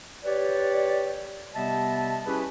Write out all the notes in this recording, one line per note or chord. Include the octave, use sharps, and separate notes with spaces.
G4 B4 C#5 D5
C3 G3 B3 D#5 E5 A5
C#4 E4 G4 G#4 B4